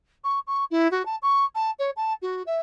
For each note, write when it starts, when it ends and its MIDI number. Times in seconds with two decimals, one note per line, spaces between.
0.24 0.39 85
0.47 0.64 85
0.70 0.90 64
0.91 1.05 66
1.05 1.16 81
1.22 1.44 85
1.55 1.70 81
1.79 1.90 73
1.96 2.13 81
2.22 2.42 66
2.46 2.60 76